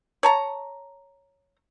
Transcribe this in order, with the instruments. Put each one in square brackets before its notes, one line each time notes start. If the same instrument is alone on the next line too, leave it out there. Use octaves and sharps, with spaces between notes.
[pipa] C#5 A5 A#5